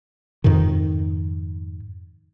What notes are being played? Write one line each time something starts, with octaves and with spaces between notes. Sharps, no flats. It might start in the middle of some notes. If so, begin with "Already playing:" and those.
F2 G#2 C3 D#3